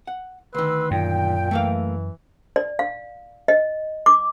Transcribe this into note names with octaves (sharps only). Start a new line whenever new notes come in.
F#5
D2 D#3 B4 C6 E6
F#2 A#2 G5
E3 A3 A#3 F5
D5
F5
D#5
D6